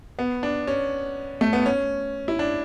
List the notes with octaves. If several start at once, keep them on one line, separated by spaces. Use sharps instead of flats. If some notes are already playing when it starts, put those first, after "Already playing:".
B3
D4
C#4
A3
B3
C#4
E4
D4